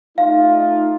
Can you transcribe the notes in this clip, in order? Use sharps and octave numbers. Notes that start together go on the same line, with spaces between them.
A3 D#4 F4 F5